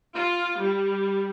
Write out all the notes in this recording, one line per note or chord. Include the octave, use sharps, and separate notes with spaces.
F4
G3